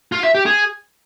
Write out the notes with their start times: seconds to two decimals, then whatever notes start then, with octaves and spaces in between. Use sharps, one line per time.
0.12 F4
0.23 E5
0.34 G4
0.46 G#4